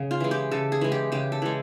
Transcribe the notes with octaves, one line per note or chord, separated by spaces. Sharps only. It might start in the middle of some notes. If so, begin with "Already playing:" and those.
Already playing: C#3
F4
E3 G#3
G4
C#3 A4
G#4
E3 G#3
G4
C#3 G4
A4
E3 G#3